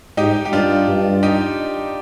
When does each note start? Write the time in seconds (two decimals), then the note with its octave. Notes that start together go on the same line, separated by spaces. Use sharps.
0.17 G#2 D#4 G4
0.45 G4
0.53 G2 D4 F4
0.88 G2
1.23 D#4 G4